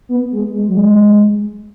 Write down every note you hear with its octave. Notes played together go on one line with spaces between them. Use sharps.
B3
G#3
G#3
F#3
G#3